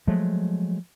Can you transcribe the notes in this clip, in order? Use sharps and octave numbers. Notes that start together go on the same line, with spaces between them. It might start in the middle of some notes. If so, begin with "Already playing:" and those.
F3 F#3 G#3 A3